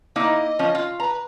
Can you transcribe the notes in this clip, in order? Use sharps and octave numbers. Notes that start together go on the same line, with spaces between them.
A#3 D#4 E4 D#5
F3 C#4
F4
B4 A#5